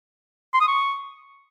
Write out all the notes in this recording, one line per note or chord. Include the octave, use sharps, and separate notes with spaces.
C6
D#6
C#6